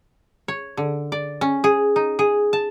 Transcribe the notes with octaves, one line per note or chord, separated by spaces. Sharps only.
C#5
D3
D5
C#4
G#4
D#4
G#4
A5